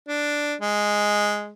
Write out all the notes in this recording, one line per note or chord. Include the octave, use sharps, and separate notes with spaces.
D4
G#3